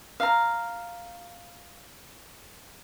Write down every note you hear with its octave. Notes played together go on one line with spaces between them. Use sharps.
F5 A#5